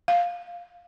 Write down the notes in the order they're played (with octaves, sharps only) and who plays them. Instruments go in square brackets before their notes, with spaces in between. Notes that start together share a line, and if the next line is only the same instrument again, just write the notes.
[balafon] F5